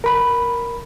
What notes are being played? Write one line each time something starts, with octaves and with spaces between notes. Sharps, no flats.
A#4 B5